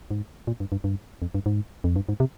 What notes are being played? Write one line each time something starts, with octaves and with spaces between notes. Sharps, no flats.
G#2
A#2
G2
G2
G2
F2
G2
G#2
F2
G2
G#2
C3